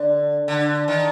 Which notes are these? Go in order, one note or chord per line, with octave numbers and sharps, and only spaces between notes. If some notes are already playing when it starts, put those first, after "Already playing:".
Already playing: D3
D3
D#3